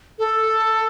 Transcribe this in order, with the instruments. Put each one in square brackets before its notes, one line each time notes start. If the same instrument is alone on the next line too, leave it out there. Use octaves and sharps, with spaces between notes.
[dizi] A4